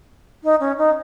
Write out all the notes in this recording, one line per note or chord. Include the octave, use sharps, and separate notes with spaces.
D#4
C#4
D#4